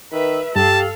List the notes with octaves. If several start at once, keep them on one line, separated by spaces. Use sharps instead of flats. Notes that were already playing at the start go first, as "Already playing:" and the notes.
D#3 B4 E5
G2 G4 A4 F5 A5